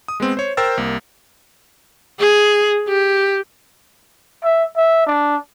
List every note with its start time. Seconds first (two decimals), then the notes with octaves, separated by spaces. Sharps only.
0.08 D#6
0.20 G#3 B3 C4
0.37 C5 C#5
0.57 A#4 C5 G5 E6 A6
0.77 C2 A#3
2.20 G#4
2.89 G4
4.44 E5
4.77 E5
5.07 D4